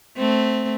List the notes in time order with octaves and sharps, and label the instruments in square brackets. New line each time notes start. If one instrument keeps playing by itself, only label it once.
[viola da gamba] A3 C4